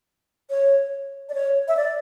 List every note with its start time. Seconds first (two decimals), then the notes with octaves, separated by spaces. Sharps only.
0.50 C#5
1.29 D5
1.34 C#5
1.68 E5
1.77 D5